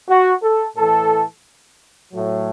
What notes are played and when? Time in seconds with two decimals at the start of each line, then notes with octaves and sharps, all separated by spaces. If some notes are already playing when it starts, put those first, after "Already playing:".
0.09 F#4
0.43 A4
0.77 A2 E3 A4
2.13 A2 F#3